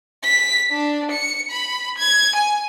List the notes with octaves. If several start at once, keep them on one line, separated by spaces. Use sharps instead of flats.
B6
D4
C#7
B5
G#6
G#5